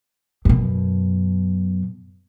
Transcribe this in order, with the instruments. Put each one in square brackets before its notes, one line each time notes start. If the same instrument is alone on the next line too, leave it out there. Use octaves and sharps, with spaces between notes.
[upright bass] F#2 B2